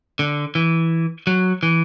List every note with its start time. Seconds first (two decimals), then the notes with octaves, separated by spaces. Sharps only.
0.19 D3
0.55 E3
1.27 F#3
1.63 E3